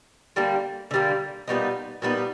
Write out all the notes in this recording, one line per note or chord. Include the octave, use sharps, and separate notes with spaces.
D3 G3 A#3
D3 G3 A#3
A#2 G3 B3 D#4
A#2 G3 B3 D#4